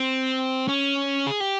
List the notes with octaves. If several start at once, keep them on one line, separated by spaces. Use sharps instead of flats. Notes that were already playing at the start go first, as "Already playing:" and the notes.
Already playing: C4
C#4
G#4
G4